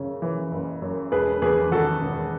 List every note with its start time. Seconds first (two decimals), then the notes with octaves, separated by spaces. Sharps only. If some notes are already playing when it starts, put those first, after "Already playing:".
Already playing: F#2 C#3
0.22 E3
0.52 F#1
0.82 F#2
1.12 E1 G#4 B4
1.42 E2 G#4 B4
1.71 D#3 F#4 A4
2.02 E1